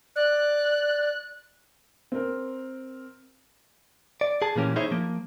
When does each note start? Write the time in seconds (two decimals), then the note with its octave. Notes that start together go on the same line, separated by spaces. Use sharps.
0.16 D5 F#6
2.12 C4 A#4
4.21 D5
4.42 G#4 A5
4.56 A#2 E3 A#3 C#4 G4
4.76 D#4 E4 G#4 C5 C#5 E5
4.91 F3 A#3